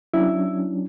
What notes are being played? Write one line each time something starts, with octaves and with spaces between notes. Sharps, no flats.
F#3 C#4 D4 E4